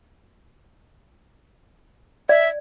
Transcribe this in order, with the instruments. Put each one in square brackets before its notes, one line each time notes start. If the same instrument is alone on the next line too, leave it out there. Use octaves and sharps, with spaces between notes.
[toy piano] D5 [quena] E5